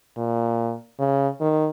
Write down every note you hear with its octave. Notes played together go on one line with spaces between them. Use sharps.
A#2
C#3
D#3